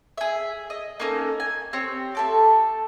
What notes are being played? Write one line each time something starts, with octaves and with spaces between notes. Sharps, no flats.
G#4 E5
D#5
A#3 C#4 D#4 A4
G#5
C4 G4 C#5
A3 A4 D6